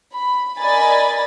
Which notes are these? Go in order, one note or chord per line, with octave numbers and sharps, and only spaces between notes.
B5
A#4 D5 D#5 G#5 B5 A6